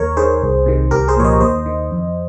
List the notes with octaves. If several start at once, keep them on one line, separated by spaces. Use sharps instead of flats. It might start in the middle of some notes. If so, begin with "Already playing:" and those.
Already playing: D#2 A#4 C#5
D#3 G#4 C5
C2
C3 D#3
C2 G4 A#4
G#4 C5
A#2 F3 C#5
C5 D#5
D#2 C5 D#5
D#3
F2